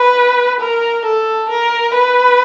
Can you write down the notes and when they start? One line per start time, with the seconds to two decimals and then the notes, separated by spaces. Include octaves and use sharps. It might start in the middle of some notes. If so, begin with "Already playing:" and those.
Already playing: B4
0.60 A#4
1.05 A4
1.49 A#4
1.94 B4